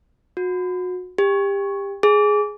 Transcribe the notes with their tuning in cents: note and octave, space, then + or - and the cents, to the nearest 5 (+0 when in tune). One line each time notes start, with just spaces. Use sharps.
F#4 -30
G4 +25
G#4 +5